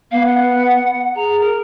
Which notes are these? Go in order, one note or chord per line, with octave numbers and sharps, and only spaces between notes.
B3 F5
F#5
G#4 A#5
A#4